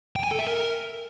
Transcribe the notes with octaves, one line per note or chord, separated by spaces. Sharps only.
G5
G#5
A4
E5
A#4